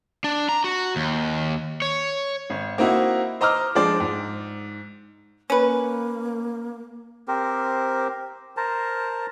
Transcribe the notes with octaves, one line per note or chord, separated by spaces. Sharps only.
D4
A#5
F#4
D#2
C#5
G#1
A#3 C4 D#4 E4 F#4
C5 D#5 A#5 D6 E6 F6
F3 G#3 D4 C5 D5
G#2
A#3 C#4 B4
C4 G4 A#4 C5
A#4 C5 A5 A#5